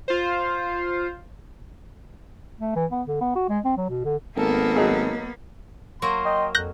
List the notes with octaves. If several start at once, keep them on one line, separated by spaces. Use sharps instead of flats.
F4 C5
A3
E3
B3
D3
B3
F#4
G#3
C4
F#3
B2
D3
G#1 A#3 B3 A4 A#4
F#3 D#4 G#4
F#3 A#3 C6
D#5 G5
F2 F#6 G6 A#6